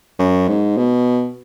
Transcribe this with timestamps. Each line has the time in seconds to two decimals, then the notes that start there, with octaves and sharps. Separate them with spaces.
0.19 F#2
0.48 G#2
0.77 B2